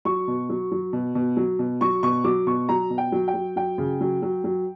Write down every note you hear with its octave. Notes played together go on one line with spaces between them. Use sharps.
F#3 C#6
B2
F#3
F#3
B2
B2
F#3
B2
F#3 C#6
B2 C#6
F#3 D6
B2 C#6
F#3 A#5
B2
G5
F#3
G5
F#3
F#3 G5
C#3
F#3
F#3
F#3